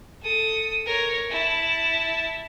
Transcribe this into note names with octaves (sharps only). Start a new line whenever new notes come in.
A4 D#6
A#4 C#5
E4 A5